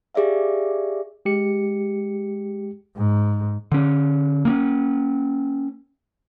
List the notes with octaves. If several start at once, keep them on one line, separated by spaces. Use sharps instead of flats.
G4 G#4 D5 E5 F5
G#3 G4 C#7
G#2
D3 C#4
A#3 C4 C#4